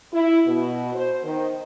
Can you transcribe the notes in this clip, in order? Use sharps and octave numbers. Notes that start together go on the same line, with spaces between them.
E4
B2
C5
D#3